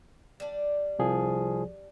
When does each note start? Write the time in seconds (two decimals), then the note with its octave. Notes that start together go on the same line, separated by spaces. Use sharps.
0.40 G3 D4
0.99 C2 F3 G#4